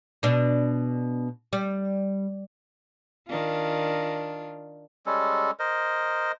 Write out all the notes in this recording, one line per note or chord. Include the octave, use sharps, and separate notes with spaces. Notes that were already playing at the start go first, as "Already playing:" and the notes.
B2 D4
G3
D#3 D4 F4
G3 G#3 C#4 A4
A#4 C5 D#5